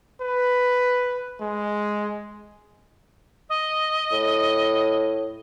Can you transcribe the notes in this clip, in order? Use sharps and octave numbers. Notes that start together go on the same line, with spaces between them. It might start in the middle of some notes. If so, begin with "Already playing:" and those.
B4
G#3
D#5
A2